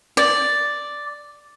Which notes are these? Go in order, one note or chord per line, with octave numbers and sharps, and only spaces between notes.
D5